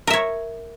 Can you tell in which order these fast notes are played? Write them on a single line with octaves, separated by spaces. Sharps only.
A#4 E5 C#5